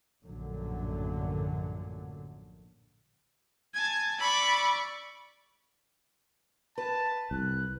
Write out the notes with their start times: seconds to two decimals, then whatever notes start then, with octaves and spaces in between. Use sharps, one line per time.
0.25 A#1 F#2 A2 D3 F#3
3.74 G#5 A5 G#6
4.20 D5 B5 C#6 E6
6.78 B4 A5
7.31 C2 F#6